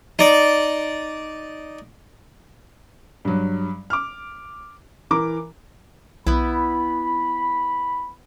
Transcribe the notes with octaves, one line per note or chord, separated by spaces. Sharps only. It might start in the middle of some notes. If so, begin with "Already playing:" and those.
D#4 D5
G2 F#3
D6 F6
E3 A#4 A#5 D6
B1 B3 E4 B5